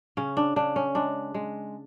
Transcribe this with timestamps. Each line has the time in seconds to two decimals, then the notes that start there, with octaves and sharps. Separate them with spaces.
0.17 C#3 C#4
0.37 D4
0.56 C#3 D4
0.76 C#4
0.95 G#3 D4
1.34 G#3